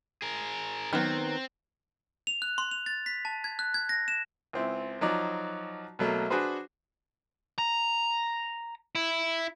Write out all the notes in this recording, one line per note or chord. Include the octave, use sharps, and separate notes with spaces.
G#4 A#4
D#3 F#3 B3 C4
F7
F#6
C6
F7
A6
B6
A5
G#6
F#6
G#6
A#6
E7
C#2 C4 E4
F3 F#3 D#4 F#4 D5
B2 F#3 A3 A#3
D4 F#4 G#4 B4 C5
A#5
E4